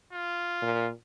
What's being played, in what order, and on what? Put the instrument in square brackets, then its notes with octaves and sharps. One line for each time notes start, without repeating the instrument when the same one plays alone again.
[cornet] F4
[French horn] A#2